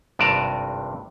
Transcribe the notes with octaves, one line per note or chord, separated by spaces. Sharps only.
G#1 G2 C3 D5 A5 A#5